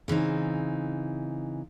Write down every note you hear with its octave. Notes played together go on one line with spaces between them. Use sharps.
C#3 E3 C4 D#4